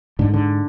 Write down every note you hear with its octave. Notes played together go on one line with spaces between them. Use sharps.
G#2 D3
D3